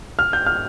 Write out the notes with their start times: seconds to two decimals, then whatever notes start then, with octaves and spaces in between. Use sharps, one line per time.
0.19 F6
0.33 G6
0.46 F6